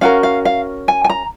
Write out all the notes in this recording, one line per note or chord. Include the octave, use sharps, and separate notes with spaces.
C#4 F#4 A#4 F5
F5
F5
G#5
G#5
A#5